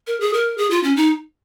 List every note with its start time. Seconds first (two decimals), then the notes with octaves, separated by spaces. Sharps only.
0.07 A#4
0.20 G#4
0.33 A#4
0.58 G#4
0.70 F4
0.83 C#4
0.96 D#4